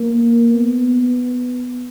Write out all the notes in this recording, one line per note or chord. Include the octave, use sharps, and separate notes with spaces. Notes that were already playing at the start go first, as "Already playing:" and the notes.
Already playing: A#3
B3